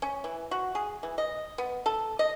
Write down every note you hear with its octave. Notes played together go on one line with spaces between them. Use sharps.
C#4
E3
F#4
G#4
E3
D#5
B3
A4
D#5